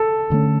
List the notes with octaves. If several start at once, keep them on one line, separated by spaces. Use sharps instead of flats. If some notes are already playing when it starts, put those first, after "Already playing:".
Already playing: A4
D2 D3 A3 C#4